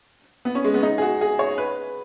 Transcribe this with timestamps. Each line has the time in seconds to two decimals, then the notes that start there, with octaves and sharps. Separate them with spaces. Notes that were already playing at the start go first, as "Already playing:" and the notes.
0.45 B3
0.55 C#4
0.64 G#3
0.74 B3
0.83 D#4
0.98 G#4
1.02 F#4
1.21 G#4
1.39 C#5
1.58 B4